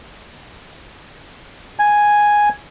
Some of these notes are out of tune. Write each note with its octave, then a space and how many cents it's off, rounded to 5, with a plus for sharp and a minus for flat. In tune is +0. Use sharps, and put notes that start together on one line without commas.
G#5 +0